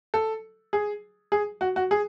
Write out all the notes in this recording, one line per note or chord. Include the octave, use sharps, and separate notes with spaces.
A4
G#4
G#4
F#4
F#4
G#4